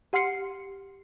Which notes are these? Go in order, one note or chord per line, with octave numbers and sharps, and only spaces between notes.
G4 F#5 C6 F6 C7 C#7